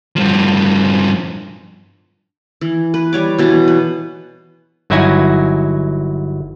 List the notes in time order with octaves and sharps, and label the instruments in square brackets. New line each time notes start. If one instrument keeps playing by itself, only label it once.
[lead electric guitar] G2 F3
[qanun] E3
B4
G3 C#5 D6
B2 E3 A5
B4
[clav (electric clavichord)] G1 F#3 D#4 E4 F#4 G#5